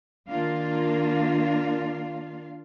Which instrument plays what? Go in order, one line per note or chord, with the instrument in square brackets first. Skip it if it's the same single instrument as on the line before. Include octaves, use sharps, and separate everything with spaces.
[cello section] D#3 A#3 D4 F4 F5